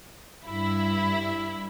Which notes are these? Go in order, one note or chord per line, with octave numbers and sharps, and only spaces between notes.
G2 E4